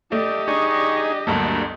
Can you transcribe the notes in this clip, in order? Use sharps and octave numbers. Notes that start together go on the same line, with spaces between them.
A3 G4 D5 D#5
D4 D#4 G#4 C#6
G1 D2 G2 F#3 A3 A#3 A5